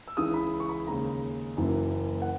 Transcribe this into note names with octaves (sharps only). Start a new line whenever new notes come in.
E6
C#2 C#3 E3 D#6
B5
C#6
B5
D#2 C#3 G#3 A#5
F#1 F#2 E3 A#3
F#5